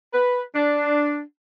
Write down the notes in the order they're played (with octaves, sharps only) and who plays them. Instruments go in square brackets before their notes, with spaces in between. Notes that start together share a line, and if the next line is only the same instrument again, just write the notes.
[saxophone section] B4
D4